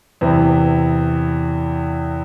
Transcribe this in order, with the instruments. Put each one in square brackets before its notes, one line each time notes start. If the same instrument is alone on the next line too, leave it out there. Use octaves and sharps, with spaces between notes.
[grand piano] E2 C3 E3 B3